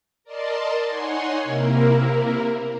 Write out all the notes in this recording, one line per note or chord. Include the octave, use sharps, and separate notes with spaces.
A#4 D5 D#5 A5 C6
D#4 C#5 F#5 G#5 C6
C3 A#3 E4 A#4